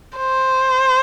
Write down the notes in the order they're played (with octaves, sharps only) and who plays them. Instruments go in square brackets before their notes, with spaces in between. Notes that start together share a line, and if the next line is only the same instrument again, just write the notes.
[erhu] C5